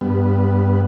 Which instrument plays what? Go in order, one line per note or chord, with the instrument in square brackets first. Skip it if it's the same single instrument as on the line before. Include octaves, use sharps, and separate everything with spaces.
[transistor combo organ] G2 B3